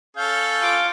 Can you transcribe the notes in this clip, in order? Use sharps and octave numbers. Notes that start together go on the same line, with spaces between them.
C#4 A4 F5 G6
F4 D6